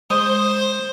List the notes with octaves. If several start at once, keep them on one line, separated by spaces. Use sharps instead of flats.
G#3 C5 D#6